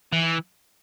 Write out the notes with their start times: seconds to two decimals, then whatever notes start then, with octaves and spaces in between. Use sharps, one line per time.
0.13 E3